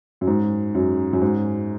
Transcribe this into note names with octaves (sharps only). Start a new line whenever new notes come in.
F#2
G#2
F#2
F#2
G#2